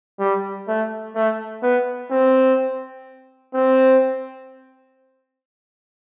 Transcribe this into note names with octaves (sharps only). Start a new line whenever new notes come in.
G3
A3
A3
B3
C4
C4